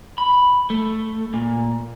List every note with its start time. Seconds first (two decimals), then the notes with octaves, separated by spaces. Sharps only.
0.18 B5
0.70 A3
1.34 A#2